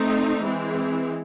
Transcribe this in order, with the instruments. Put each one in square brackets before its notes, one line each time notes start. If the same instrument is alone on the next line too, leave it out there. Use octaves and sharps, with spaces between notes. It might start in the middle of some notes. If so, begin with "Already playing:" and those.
Already playing: [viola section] A3 C4 D#4
E3 G#3 C4